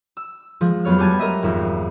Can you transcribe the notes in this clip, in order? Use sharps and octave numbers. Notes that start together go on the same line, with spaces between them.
E6
F3 G#3
F2 F#3 B3 C#5 F6
G3 B3 G#5 A5 G#6
A#4 D#5 E5
G#1 F2 E5